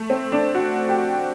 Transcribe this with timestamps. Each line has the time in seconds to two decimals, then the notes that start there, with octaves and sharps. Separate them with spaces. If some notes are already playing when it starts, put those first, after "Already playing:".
Already playing: A3
0.10 C4
0.32 D4
0.55 F#4
0.89 G4